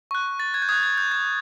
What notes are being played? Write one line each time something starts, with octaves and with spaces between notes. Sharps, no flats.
C#6 F#6
A6
G#6
G6
D#6 F#6 G#6
G#6
G6
G#6